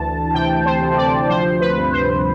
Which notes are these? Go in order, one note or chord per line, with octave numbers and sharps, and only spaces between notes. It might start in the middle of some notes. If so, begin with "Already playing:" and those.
Already playing: D2 E3 A5
C3 G5
C5
D2
D5
F3 C5
B4
G2
C5